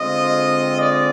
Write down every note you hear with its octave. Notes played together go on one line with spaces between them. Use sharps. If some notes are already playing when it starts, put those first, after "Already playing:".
Already playing: D3 G#3 C4 F4 D#5
D5